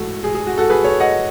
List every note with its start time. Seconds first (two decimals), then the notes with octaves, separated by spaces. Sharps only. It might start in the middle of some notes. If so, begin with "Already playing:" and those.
Already playing: G#2 E3 A3 F#4 A4
0.24 G#4
0.35 G#4
0.47 F#4
0.58 F#4 A4
0.70 G#4 B4
0.84 A4 C#5
1.00 D#5 F#5